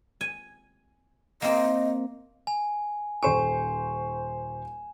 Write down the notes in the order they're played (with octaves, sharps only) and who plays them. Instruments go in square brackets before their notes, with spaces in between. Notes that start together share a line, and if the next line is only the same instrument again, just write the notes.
[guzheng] G#5
[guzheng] A#3 C4 [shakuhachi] D#5
[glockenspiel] G#5
[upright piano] D#1 C5 C#6 [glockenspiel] G#5 E7